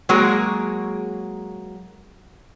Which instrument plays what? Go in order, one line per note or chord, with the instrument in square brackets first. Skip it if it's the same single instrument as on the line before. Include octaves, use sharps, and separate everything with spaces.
[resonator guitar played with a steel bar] F#3 G#3 A#3 F#4 G#4 A#4